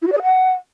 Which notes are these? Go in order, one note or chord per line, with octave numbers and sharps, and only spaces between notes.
E4
F#4
D5
G#4
F#5